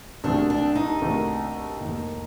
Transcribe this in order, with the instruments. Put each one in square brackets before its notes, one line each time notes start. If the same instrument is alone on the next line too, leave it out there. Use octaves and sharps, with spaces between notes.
[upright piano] C2 C3 D#3 F#3 A3 [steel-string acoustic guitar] D4
[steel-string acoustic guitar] D4
D#4
[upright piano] C2 C3 D#3 F#3 A3
F1 D#2 D#3